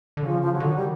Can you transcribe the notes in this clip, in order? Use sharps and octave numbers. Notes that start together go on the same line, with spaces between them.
D3
C#3 F3
F3
F#3
D3
D#3
G3